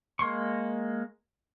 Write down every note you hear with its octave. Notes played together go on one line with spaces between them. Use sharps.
G#3 A#3 C6 C#6